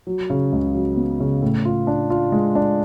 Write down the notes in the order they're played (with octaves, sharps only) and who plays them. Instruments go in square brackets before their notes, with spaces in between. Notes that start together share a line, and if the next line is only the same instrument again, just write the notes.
[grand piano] F#3
C#3
C#2
F#3
B3
C#3
A2
F4
D4
F4
G#3
D4